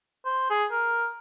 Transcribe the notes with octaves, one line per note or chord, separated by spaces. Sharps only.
C5
G#4
A#4